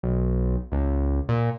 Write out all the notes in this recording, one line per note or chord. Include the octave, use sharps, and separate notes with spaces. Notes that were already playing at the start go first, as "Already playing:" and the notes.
B1
C#2
A#2